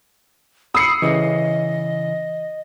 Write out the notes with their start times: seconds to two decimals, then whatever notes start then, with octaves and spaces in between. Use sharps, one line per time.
0.75 B5 D#6 E6 C7 C#7
1.02 C#3 E3 D#5